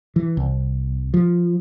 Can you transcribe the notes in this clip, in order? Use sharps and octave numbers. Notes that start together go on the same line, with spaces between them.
E3
C2
F3